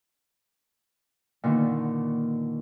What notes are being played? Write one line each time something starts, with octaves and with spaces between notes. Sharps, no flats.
A#2 D3 D#3 B3